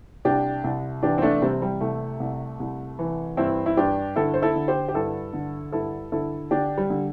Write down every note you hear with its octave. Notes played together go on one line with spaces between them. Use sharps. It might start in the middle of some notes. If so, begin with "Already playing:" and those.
C2 D4 G4
C2
E3 D4 G4
C4
A3 D4
C3 G3 C4
G3
C2 A3
C2
C2
E3
G2 C4 E4
E4
G2 D4 G4
D3 E4 A4
C5
E4 A4
D3
G4 C5
G4
G2 E4 A4
D3
G2 E4 A4
D3 E4 A4
D3 D4 G4
G3
D3